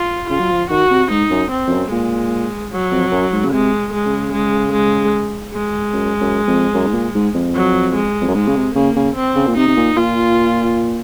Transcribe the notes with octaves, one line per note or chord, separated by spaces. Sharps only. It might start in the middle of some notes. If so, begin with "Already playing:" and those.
Already playing: F4
C#3 F4
F#3
F3
D#3 F#4
C3
G#2 D#4
F#2
C4
F2
F#2
A#2 G#3
F#3
F2
F#2
G#2
C#3
C3 G#3
G#3
C#3
G#3
G#3
G#3
F#2
F#2
F2
F#2
G#2
A#2
G#2
F2
F#3
G#3
F2
F#2
G#2 G#3
C#3
C3
C#3 A#3
C#3
C4
C#3
A#2
C3 D#4
C3
A#2
A#2 F4